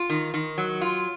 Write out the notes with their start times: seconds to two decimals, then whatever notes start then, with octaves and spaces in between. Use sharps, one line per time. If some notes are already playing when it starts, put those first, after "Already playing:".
Already playing: F4
0.10 D#3
0.34 D#3
0.58 F#3
0.81 F4